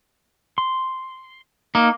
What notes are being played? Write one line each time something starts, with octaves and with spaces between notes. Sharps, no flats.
C6
A#3 D#4